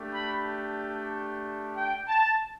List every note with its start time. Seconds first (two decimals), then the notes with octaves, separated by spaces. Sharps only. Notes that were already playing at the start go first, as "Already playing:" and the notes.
Already playing: A3 D4 G4
0.13 B5
1.76 G5
2.08 A5